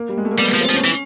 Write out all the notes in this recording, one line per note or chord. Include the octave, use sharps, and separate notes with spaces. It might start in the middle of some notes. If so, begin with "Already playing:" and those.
Already playing: A#3
G3
G#3
A3
A#3
G3 B3
B3
F3
C4
F3
C#4
E3